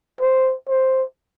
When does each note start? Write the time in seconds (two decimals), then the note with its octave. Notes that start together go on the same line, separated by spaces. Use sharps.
0.20 C5
0.69 C5